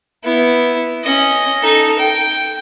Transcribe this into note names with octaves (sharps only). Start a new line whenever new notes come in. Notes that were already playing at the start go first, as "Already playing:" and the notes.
B3 E4
C#4 D#5
D#4 A4
G5